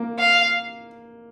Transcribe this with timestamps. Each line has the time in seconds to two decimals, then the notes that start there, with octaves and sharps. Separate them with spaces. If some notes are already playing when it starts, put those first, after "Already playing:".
Already playing: A#3
0.19 F5